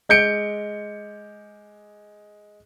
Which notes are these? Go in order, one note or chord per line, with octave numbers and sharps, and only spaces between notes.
G#3 G6 C#7 D7